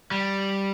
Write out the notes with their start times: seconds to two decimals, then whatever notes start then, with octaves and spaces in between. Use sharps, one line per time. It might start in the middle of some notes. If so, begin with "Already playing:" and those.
0.11 G3